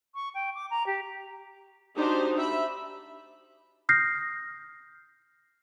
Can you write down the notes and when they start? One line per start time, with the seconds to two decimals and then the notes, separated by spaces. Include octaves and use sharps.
0.15 C#6
0.34 G5
0.54 D6
0.70 A#5
0.86 G4
1.97 D4 D#4 F#4 G4 C5
2.35 G4 E5 B5
3.89 D#6 F6 G6 A#6 C7